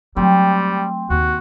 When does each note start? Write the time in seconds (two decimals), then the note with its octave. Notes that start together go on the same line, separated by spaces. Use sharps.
0.17 F#3 G3 A3 C4
1.10 D#2 F#4